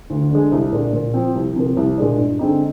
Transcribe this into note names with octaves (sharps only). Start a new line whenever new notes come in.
D2
D3 G#3
C2
A#2 G#3 D4
A#2
F3 C4
C2
C3 F3 A#3
C2
A#2 G#3 D4
G2
D3 G#3 C4 D#4